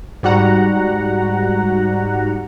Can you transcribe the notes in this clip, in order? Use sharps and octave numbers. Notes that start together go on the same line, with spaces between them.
G#2 G3 F#4 F#5 A#5